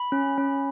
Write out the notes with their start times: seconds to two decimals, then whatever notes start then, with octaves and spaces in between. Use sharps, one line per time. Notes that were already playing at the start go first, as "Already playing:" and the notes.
Already playing: B5
0.12 C#4
0.38 C#4